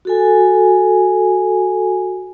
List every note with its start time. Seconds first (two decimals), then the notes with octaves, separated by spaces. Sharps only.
0.05 F#4 A4 G#5